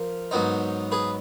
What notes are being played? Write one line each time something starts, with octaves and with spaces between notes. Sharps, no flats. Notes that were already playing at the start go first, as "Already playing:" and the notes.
Already playing: F3 A#4
G#2 F#3 B3 D#4
G#4 B4